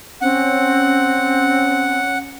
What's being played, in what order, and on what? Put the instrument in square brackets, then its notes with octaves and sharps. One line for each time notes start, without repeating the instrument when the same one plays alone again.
[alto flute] C4 [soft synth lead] C#4 [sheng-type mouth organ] F#5